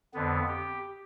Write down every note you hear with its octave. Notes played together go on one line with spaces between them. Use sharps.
F2 D3 B3
G4